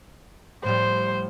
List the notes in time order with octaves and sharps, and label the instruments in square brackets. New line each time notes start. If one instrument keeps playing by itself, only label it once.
[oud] A2 F3 G3 [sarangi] C5